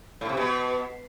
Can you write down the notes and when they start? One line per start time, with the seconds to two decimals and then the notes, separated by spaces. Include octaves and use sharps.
0.21 A2
0.29 C3
0.37 B2